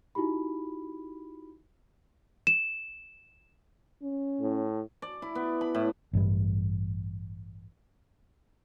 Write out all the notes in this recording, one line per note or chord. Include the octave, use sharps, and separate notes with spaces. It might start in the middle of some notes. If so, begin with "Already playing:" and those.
D#4 E4 F#4 G4 B5
E7
C#4
A2
D5
E4
B3
B5
A2
A1 G2 G3